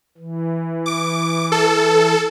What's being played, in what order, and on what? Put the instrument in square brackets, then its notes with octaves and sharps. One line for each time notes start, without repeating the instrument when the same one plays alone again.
[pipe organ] E3
[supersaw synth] D6
A4